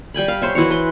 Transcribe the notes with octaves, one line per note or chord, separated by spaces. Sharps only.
G3 G5 G#5 B5
F5
C5 C#5 E5
E3 E4 F#4 C#5
B4 C6